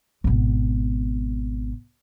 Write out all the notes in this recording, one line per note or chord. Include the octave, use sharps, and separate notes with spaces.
G#1 B2